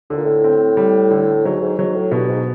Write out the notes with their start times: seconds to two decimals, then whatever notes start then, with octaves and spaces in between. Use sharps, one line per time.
0.10 A2 D3
0.17 A#2
0.25 A2
0.44 C4
0.77 G3
1.11 D3
1.45 G#2 F#3
1.61 G#2
1.78 G#2 F#3
1.95 A2
2.11 G2 B2
2.29 G#2